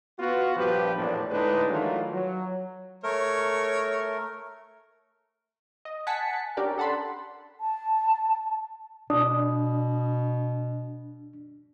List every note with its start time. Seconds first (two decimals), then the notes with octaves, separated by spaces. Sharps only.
0.18 B3 F4 F#4
0.56 A#1 G2 F3 B3 G4 B4
0.96 A#1 E2 A2 F3 D4
1.30 A2 D3 G#3 D4 D#4 B4
1.69 D#3 E3 F#3 A3 F4
2.13 F#3
3.04 A3 A#4 C#5
5.85 D#5
6.07 F#5 G#5 A5 B6 C#7
6.57 C#4 D4 G4 A#4 D5
6.78 A4 F#5 A5 B5 C6
7.61 A5
9.10 B2 D4 D#6